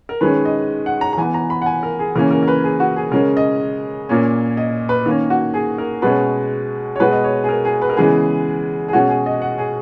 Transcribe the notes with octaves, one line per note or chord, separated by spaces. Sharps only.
A#4
D#3 G#3 C#4 B4
D#5
F#5
A#5
A#5
E3 B3 G#5
A#5
B5
F#5
G#5
A#4
G#4
C#3 E3 A#3 C#4 A#4
A#4
A#4
B4
G#4
F#4
G#4
C#3 G#3 C#4 A#4
D#5
A#2 A#3 C#4
D#5
B4
D#3 A#3 C#4 A#4
F#4
G#4
A#4
B2 G#3 C#4 B4
C#5
B2 G#3 B3 B4
D#5
C#5
G#4
A#4
G#4
B4
A#4
C#3 E3 G#3 B3 G#4
G#4
B2 G#3 C#4 F#4
G#4
D#5
F#5
G#4